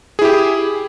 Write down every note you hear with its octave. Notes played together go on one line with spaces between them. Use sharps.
E4 G4 G#4